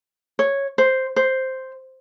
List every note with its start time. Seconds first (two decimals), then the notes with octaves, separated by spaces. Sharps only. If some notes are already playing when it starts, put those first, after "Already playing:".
0.39 C#5
0.78 C5
1.16 C5